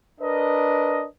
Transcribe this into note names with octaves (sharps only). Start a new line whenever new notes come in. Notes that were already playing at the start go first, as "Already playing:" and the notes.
D4 A#4 B4 D#5